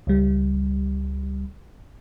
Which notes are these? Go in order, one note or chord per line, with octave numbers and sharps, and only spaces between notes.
C#2 G3